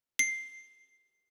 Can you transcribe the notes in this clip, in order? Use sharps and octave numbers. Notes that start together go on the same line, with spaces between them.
C7